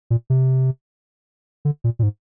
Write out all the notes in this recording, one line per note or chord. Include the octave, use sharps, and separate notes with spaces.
A#2
C3
D3
A#2
A#2
G#2